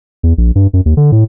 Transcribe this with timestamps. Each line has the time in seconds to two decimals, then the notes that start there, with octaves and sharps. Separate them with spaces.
0.23 E2
0.38 A#1
0.55 G2
0.73 F#2
0.86 D#2
0.97 D3
1.12 A2